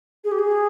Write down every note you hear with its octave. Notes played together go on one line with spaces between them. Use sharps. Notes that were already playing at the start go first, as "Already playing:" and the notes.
G#4
G4
G#4